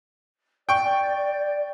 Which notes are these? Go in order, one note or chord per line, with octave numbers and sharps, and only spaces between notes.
D5 G5 C#6